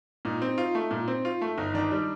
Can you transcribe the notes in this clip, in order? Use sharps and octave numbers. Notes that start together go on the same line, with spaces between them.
A#2 D#4
C4
F4
A3
A#2
C4
F4
A3
G1 D#4
D#3 D4
G3 D4